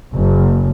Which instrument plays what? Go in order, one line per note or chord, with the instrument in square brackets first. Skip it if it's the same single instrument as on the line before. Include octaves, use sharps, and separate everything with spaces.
[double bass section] F#1